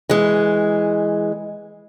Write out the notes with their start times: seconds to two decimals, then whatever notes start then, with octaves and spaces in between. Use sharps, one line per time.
0.09 E3 G#3